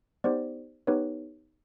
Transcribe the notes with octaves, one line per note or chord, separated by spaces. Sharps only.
B3 D#4 G4 C5 D5
B3 D#4 G4 B4 C#5